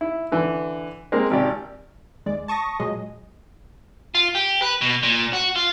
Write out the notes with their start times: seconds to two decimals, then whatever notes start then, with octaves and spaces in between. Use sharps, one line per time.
0.01 E4
0.32 D3 E3
1.12 G#3 A#3 C4 A#4
1.31 G#1 C3 G4 D5
2.26 D#2 G#3 D5
2.48 A5 C#6 D#6 A#6
2.80 A#2 F#3 G#3 G#4 D#5
4.15 F4
4.35 G4
4.62 B4
4.81 B2
5.03 A#2
5.33 F#4
5.56 F4